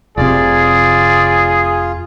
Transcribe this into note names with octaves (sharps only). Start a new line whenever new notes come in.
F1 C3 F4 G#4 D5